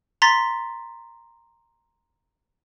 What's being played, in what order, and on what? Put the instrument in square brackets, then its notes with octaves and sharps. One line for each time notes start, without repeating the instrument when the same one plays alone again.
[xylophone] A#5 C6 A6 B6